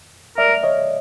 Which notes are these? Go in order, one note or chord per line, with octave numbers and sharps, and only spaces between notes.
A#4 D5 E5
C#5 D#5